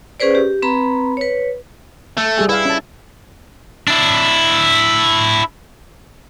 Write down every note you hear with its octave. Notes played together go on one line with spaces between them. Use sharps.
C#4 G#4 B4 C5 D5
G4
C4 B4 A#5 B5
B4 C#5
A3
G3 G#4 G#5
E4 B4 F5
C#4 A5
D4 E4